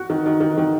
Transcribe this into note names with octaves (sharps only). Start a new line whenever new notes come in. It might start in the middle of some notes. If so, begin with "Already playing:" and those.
Already playing: F#4
D#3
D#3
D#3
D#3